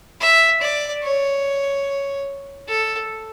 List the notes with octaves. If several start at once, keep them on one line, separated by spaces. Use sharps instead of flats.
E5
D5
C#5
A4